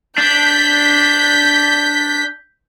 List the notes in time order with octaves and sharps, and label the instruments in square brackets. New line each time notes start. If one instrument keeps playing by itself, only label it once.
[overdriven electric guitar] D4 [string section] G6 B6